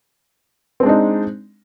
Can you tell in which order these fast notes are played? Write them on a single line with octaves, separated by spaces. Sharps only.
C4 G#3 D4 D#4